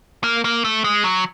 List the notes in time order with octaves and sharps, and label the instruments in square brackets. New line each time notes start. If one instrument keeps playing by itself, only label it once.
[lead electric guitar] A#3
A#3
A3
G#3
F#3